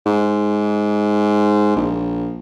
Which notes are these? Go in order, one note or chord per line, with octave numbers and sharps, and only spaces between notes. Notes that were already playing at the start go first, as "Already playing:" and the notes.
G#2
A#1